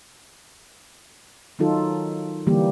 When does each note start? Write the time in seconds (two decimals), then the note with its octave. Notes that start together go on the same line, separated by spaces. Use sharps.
1.59 D#3 F#3 D#4 F4 A4
2.47 D3 E3 G3 A#3 G4